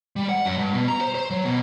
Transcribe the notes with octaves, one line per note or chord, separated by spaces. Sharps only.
G3
F#5
F#2
G2
B2
A#5
C5
C5
F#3
B2